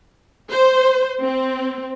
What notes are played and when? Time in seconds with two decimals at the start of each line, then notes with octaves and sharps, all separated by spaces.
0.50 C5
1.22 C4